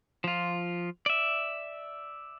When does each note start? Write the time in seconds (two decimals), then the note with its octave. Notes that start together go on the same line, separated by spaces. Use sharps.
0.24 F3 F4
1.06 D5 E5